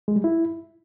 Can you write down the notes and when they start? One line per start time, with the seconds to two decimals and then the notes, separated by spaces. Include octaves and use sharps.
0.08 G#3
0.16 G3
0.24 E4